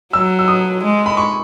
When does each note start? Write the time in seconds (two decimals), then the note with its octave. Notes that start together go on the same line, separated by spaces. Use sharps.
0.13 F#3 E6
0.39 E6
0.48 D#6
0.83 G#3
1.06 B5
1.17 C#6